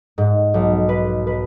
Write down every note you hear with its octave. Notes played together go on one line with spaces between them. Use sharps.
G#2
B1
B4
B4